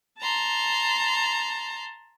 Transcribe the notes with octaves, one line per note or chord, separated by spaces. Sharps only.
A5 A#5 C6